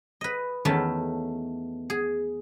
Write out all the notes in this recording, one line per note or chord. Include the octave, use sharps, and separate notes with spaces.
B4 D#5
E2 D#3 A3 C#4 E5 A5
G#4